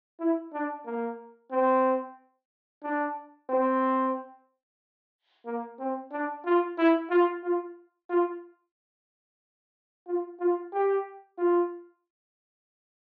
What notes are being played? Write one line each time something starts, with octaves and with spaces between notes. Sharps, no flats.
E4
D4
A#3
C4
D4
C4
A#3
C4
D4
F4
E4
F4
F4
F4
F4
F4
G4
F4